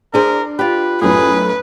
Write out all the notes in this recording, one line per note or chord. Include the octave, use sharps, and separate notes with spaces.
D4 E4 G#4 A#4 C5
F4 G4 B4
B1 F#2 A2 G#4 B4